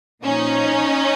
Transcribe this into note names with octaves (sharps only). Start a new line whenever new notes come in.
A#2 F3 C#4 D#4